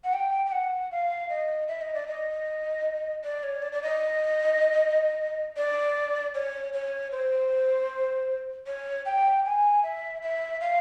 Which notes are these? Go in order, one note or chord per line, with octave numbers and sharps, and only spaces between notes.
F#5
G5
G5
F#5
F5
D#5
E5
D#5
D5
D#5
D5
C#5
D5
D5
D#5
D5
C#5
C#5
C5
C#5
G5
G#5
E5
E5
F5